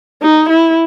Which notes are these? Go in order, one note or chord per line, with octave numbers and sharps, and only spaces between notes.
D#4
E4